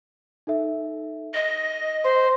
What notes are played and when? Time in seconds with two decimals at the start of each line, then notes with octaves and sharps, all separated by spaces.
0.47 D#4 A4 E5
1.34 D#5 A#6
2.04 C5 C6